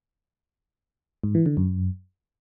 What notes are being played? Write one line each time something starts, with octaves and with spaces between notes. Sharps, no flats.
G#2
E3
D3
F#2